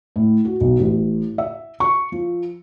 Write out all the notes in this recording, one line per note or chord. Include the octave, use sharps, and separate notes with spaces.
A2
F#4
B1
A1
E5
C#6
F3